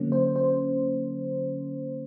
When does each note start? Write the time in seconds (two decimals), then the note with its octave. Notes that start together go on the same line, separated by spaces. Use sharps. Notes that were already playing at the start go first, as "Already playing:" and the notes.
Already playing: D3 F#3 A#3 C#4
0.12 C5
0.36 C5